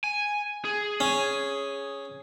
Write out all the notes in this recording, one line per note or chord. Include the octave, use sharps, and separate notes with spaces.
G#5
G#4
C#4